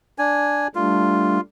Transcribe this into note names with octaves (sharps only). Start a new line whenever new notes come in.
D4 G#5
G3 A3 D4 F4